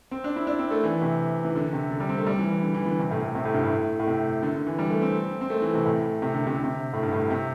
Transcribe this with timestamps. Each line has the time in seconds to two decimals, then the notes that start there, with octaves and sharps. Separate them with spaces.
0.11 C4
0.24 D4
0.36 E4
0.47 D4
0.59 C4
0.71 A3
0.84 E3
1.02 C3
1.45 E3
1.56 D3
1.73 C3
1.91 D3
2.00 G3
2.09 C4
2.18 A3
2.26 G3
2.39 E3
2.52 E3
2.63 D3
2.74 E3
2.86 D3
2.99 C3
3.11 A2
3.22 A2
3.35 C3
3.45 A2
3.54 G2
3.63 A2
3.99 A2
4.07 C3
4.43 D3
4.55 D3
4.66 E3
4.78 G3
4.90 A3
5.02 C4
5.41 C4
5.50 A3
5.62 E3
5.74 C3
5.86 A2
6.22 C3
6.34 D3
6.46 C3
6.55 D3
6.64 C3
6.93 A2
7.03 G2
7.12 A2
7.30 C3